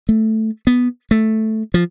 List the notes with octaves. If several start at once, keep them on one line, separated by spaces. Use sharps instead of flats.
A3
B3
A3
F3